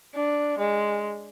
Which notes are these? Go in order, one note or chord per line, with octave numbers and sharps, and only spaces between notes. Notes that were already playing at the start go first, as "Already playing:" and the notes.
D4
G#3